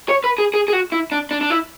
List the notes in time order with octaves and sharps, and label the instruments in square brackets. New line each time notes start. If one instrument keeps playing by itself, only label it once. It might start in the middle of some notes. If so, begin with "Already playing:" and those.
[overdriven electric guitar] C#5
B4
G#4
G#4
G#4
F#4
E4
D4
D4
D4
E4